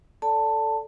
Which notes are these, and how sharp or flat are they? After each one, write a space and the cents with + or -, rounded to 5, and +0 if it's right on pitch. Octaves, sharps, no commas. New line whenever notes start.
A4 +0 D5 -15 A5 +10